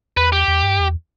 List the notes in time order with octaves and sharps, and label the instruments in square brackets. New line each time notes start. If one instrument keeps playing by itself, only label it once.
[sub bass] E2 [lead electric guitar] B4
[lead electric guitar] G4
[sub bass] E2
G2
E2